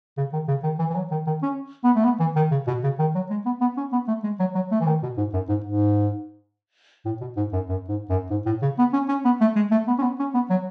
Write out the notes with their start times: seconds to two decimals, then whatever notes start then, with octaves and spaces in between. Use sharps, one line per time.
0.17 C#3
0.33 D#3
0.48 C#3
0.63 D#3
0.79 E3
0.90 E3
0.96 F#3
1.11 D#3
1.26 D#3
1.43 C#4
1.84 B3
1.96 A3
2.04 B3
2.20 E3
2.36 D#3
2.51 C#3
2.67 B2
2.83 C#3
2.99 D#3
3.15 F#3
3.30 G#3
3.46 B3
3.61 B3
3.77 C#4
3.92 B3
4.08 A3
4.24 G#3
4.39 F#3
4.55 F#3
4.72 A3
4.81 E3
4.87 D#3
5.03 B2
5.17 G#2
5.33 F#2
5.49 G#2
5.64 G#2
7.05 A2
7.21 B2
7.37 G#2
7.53 F#2
7.69 F#2
7.89 G#2
8.09 F#2
8.31 G#2
8.46 A2
8.62 C#3
8.78 B3
8.93 C#4
9.09 C#4
9.25 B3
9.41 A3
9.56 G#3
9.71 A3
9.88 B3
9.98 C#4
10.02 B3
10.19 C#4
10.34 B3
10.50 F#3